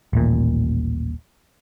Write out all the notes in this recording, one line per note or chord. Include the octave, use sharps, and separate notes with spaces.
D#1 A1 A#2